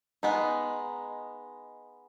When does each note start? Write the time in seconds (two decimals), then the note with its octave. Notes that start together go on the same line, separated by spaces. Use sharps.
0.23 G#3 B3 D#4